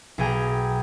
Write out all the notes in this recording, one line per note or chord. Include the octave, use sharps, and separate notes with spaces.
B1 G#4 G5 A#5